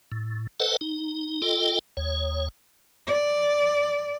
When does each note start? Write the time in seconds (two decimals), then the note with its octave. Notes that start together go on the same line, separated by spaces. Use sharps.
0.12 A2
0.60 A4 B4 C5 D#5 F#5 A5
0.81 D#4
1.42 F4 A4 D#5 G5
1.97 D#2 C#5
3.07 D5